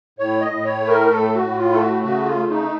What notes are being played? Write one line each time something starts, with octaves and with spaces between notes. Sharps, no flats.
A2 C#5
D#5
A2
C#5
A3
A#4
A2 A4
F#4
A2
F4
A3 A4
F#4
C#3 F#4
F4
A3
D#4